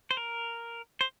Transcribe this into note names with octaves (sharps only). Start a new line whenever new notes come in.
C5
A#4
C5